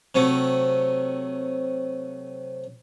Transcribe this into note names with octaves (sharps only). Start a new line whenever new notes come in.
C3 F#3 A3